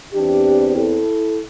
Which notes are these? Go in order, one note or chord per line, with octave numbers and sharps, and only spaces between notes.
E2 E3 C4 D4 G4
E4 A4